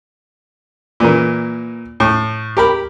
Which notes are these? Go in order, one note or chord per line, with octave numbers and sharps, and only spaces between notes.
A#2 E3 A#3
A2
G4 A#4 B5